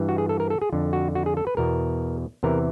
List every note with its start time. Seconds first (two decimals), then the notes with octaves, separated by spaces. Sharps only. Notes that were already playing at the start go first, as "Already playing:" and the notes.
Already playing: G2 E3
0.09 F#4
0.18 G#4
0.29 A4
0.40 A#4
0.50 A4
0.62 G#4
0.73 F2 D3
0.93 F#4
1.15 F#4
1.26 G#4
1.37 A4
1.47 B4
1.57 E2 B2 A#4
2.43 E2 C3 E3 A#4